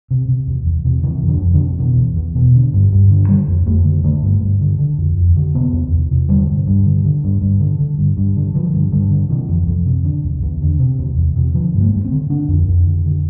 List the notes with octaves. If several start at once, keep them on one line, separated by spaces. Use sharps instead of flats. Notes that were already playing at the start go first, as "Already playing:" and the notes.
C3
C3
E2
E2
C3
C3 E3
F2
D3
F2
D3
C3
B2 E3
E2
E2
B2
D3
G2
G2
D3
D3 G3
F2
F2 A3
D3
D3 A3
G2
G2
D3
D3
F2
F2
D3
C3 B3
E2
E2
C3
D3 G3
G2
G2
D3
D3
G2
G2
D3
D3
G2
G2
D3
D3 F3
G2
G2 D3
D3
C3 E3
F2
F2
C3
D3
E2
E2
D3
C3
E2
E2
C3
D3 F3
G2
A3
G2
C4
D3
D3 D4
F2
F2
D3
D3